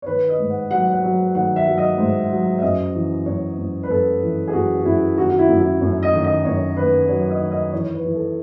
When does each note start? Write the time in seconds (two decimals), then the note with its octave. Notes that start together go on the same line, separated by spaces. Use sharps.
0.02 C#5
0.06 D#3 B4
0.29 D#5
0.39 G#2
0.50 F#5
0.70 F#3 F#5
0.91 F#5
1.03 F#3
1.35 D#3 F#5
1.56 E5
1.66 F#3
1.78 D#5
1.98 G#2
2.30 F#3
2.58 E5
2.62 F#2 D#5
2.95 E3
3.26 F#2 C#5
3.58 F#2
3.83 B4
3.89 F#2 A4
4.22 E3
4.47 G#4
4.53 F#2 F#4
4.80 F#4
4.85 F#2 E4
5.17 D#3 F#4
5.30 F#4
5.38 E4
5.49 F#2
5.60 E4
5.81 F#2
6.03 D#5
6.13 D#3
6.24 D#5
6.45 F#2 C#5
6.77 D#3 B4
7.08 F#3 C#5
7.30 D#5
7.41 D#3
7.51 D#5
7.73 E3 C#5
7.94 B4
8.04 E3
8.15 A4